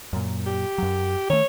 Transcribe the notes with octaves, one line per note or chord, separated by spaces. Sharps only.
F#2 A#2
G4
F#2 F#3
D#3 A3 C#5